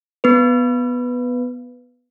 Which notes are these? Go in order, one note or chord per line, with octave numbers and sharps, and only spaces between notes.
B3 B4